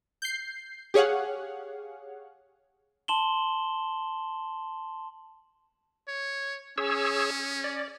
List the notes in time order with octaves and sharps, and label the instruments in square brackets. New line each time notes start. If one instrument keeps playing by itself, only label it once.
[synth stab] G6 C7
G4 G#4 C#5 F5 F#5
[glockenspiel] A5 C6 E7 F#7 G7
[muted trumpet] C#5
[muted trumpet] C#4 [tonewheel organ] G#4 C#5 E6
[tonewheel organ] D5